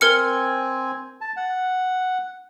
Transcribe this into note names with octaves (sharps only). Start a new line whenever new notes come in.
C4 A#4 G#5 F6 C#7
A5
F#5